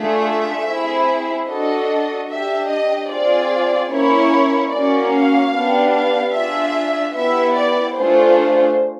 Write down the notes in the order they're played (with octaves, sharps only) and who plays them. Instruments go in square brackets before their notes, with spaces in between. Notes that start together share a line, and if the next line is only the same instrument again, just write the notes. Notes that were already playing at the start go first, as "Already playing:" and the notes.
Already playing: [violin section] A3 D4 F4 G#4 E5
C4 E4 G#4
D4 F#4 A4 D#5
D4 G4 E5
D#5
C4 F4 G#4 D5
A#3 C#4 E4 C#5
A#3 C#4 F#4 D5
F5
B3 D4 G4
F5
D4 F4 G#4 E5
B3 E4 G4 E5
D5
A3 D4 F4 G#4 C5